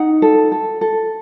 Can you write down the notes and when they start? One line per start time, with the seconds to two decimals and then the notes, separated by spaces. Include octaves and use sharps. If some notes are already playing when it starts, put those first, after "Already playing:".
Already playing: D#4 F#5
0.22 A4
0.52 A4
0.81 A4